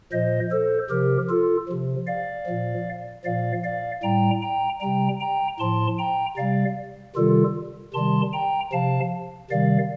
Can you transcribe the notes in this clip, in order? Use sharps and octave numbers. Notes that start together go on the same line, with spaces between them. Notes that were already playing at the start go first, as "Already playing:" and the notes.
A#2 F3 C5 D#5
A4 C5
C3 F3 G4 A#4
F4 A4
C3 F3
D5 F5
A#2 F3
A#2 F3 D5 F5
D5 F5
A2 G3 G5 A#5
G5 A#5
C3 G3 G5 A#5
G5 A#5
A2 F3 A5 C6
G5 A#5
C3 G3 D5 F5
C3 D#3 G3 F4 A4
C3 D#3 G3 A5 C6
G5 A#5
C3 F3 F5 A5
C3 D#3 G3 D5 F5